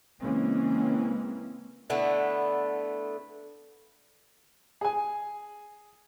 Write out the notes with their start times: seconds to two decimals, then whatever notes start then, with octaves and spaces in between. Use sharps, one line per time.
0.22 C#3 E3 G#3 A#3 C4 C#4
1.90 D3 A3 B3 E4
4.81 G#4 G#5